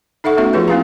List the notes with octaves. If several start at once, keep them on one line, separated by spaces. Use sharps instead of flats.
D#4 A4 E5 F#5 C#6
A3 B3 C#4 F#4 E5
F3 F4 G#4 B4
A#3 C4 E4 G4 F5 A#5